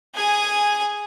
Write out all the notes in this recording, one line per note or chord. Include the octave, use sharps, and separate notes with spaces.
G#4 G#5